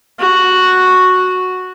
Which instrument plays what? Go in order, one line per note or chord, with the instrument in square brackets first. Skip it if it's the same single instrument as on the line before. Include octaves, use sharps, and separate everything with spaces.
[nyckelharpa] F#4